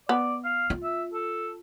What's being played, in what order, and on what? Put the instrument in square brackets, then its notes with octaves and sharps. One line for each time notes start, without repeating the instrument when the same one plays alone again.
[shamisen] B3 [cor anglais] D5
[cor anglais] F5
[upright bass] F4
[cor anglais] E5
A4